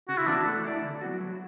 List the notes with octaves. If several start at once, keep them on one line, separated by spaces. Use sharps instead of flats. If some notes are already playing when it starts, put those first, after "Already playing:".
C#3 F#4
E4
E3 B3 D4 F#4
A3
E4 A4 D5
D3
F#3 B3 F#4
F#3